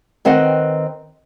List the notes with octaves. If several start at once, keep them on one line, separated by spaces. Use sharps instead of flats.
D#3 C4 B4 D#5 F#5 G5